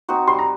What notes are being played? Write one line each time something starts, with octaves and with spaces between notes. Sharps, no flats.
C4 D#4 F#4
G3 C6
A#5